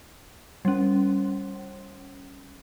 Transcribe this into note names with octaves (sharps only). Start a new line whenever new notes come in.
G3 C#4